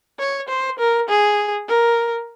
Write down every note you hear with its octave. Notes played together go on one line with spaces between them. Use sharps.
C#5
C5
A#4
G#4
A#4